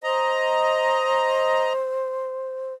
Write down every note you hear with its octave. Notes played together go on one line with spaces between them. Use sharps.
C5 D#5 A#5